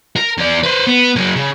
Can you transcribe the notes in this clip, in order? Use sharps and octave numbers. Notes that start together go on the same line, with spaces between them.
A#4
E2 D5
B4 C5
B3
F#3 A#3
C#3